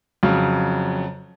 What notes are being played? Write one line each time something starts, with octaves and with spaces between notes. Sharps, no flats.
F2 C#3 F#3